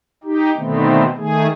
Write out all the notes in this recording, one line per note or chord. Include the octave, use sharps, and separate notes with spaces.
D#4 G4
B2 D3 D#3 A3 B3 C4
D#3 A3 G#4